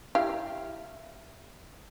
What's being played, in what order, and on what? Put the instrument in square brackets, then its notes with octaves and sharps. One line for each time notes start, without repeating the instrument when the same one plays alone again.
[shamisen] E4 G4 F5